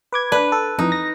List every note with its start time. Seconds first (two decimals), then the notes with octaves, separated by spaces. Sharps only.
0.13 B4 D6 G#6
0.32 D4 B4
0.52 A4
0.79 F2 E3 D#4
0.92 A#6